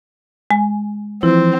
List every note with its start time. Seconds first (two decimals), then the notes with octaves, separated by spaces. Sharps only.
0.51 G#3 G#5
1.23 E3 F3 C4 E4